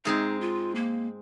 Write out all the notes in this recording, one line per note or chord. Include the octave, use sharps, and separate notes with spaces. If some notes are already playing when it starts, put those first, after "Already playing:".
G#2 G#3 C4 D#4
F4
A#3